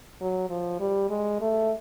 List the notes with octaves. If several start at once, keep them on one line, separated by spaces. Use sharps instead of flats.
F#3
F3
G3
G#3
A3